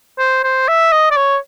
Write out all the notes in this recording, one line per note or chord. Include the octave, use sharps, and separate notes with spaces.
C5
C5
E5
D#5
D5
C#5